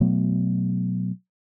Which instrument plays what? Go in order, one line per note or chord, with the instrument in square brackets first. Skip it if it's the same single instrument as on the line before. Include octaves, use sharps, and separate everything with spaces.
[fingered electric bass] B2 F#3 A3 B3